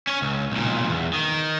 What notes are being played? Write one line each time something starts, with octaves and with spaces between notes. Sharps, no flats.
C#4 C#5
C#2
B1 A#2
E2
D#3